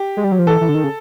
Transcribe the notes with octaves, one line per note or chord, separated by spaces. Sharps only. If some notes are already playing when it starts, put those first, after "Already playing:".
Already playing: G4
G#3
G3
F#3
F3
E3 A4
E3
D3
D#3
C#3